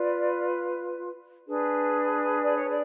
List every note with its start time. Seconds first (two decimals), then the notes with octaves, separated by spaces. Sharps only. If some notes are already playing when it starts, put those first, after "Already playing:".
Already playing: F4 B4 D5
1.47 D4 G#4 B4
2.41 D5
2.54 C#5
2.69 D5